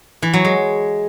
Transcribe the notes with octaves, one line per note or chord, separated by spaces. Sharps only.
E3
F#3
G#3